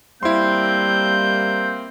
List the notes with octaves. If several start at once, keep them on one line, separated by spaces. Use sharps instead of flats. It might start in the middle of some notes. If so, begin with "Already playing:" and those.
G3 A#3 C4 E4 C6 G6